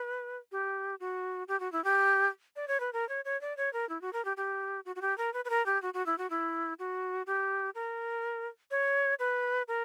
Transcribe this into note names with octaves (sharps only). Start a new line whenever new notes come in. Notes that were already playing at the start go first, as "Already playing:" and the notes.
Already playing: B4
G4
F#4
G4
F#4
E4
G4
D5
C#5
B4
A#4
C#5
C#5
D5
C#5
A#4
E4
F#4
A#4
G4
G4
F#4
F#4
G4
A#4
B4
B4
A#4
G4
F#4
F#4
E4
F#4
E4
F#4
G4
A#4
C#5
B4
A#4